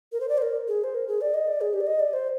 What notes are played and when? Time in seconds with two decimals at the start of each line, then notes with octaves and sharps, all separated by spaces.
0.12 A#4
0.21 C5
0.29 D5
0.38 C5
0.42 A#4
0.68 G#4
0.84 C5
0.95 A#4
1.08 G#4
1.21 D5
1.34 D#5
1.47 D5
1.61 G#4
1.73 G4
1.81 D5
1.87 D#5
2.00 D5
2.13 C5